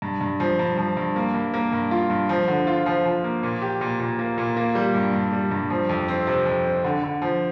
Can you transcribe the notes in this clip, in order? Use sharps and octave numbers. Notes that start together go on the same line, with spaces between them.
G2
G2
F3
G2
F3
G2
A#3
G2
A#3
G2
F4
G2
F3
D3
F4
F3
F3
A#3
A#2
G4
A#2
A#2
A#3
A#2
A#3
G3
G2
G2
G3
G2
F3
F2
C4
C3
F2
C4
D3
D3
F3